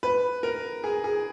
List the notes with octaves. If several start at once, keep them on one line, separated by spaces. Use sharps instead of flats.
B4
A#4
G#4
G#4